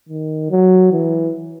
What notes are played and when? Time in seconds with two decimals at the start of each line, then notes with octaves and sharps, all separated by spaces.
0.09 D#3
0.51 F#3
0.92 E3